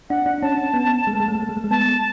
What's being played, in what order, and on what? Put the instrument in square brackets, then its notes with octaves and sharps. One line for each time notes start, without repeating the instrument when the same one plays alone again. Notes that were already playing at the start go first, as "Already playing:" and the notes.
[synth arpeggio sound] D4 [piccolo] F#5
[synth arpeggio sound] D4
[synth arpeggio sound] C#4 [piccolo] A5
[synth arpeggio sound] B3
G#3
A3
G#3
A3
G#3
A3
G#3
A3
G#3
[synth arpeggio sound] B3 [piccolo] A5